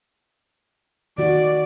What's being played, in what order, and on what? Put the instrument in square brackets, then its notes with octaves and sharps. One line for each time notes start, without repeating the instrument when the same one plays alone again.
[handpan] D#3 F#4 [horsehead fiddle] D5